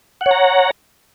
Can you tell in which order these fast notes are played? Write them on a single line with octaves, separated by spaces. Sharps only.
F#5 C#5 A#5